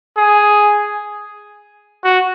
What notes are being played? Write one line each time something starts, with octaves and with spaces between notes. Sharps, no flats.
G#4
F#4